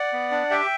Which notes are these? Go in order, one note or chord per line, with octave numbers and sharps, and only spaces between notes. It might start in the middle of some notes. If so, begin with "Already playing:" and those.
Already playing: D5 F#5
B3
D4
G4 E5 G5